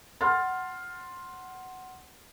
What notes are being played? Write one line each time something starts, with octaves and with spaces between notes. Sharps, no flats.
F#5 C6 F6 A6